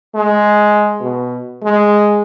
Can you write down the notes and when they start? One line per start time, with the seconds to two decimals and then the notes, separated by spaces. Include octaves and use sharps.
0.15 G#3
1.00 B2
1.63 G#3